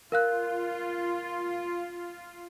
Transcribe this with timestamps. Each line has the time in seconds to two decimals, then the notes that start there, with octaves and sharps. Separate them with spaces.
0.12 F4 A#4 F5 F#6